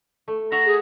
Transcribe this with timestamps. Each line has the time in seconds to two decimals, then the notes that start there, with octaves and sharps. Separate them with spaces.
0.28 A3
0.52 F#4 E5 F#5 A#5
0.66 G#4